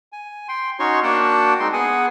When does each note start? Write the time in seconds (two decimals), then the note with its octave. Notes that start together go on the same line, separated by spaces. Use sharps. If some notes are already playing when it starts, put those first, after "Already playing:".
0.12 G#5
0.48 G5 C6
0.79 C#4 D#4 F#4 C#5 C6 C#6
1.03 A#3 D4 F#4 F#5 G5 A5
1.60 G#3 C4 D#4 G5 C6
1.73 B3 G#4 F#5 G#5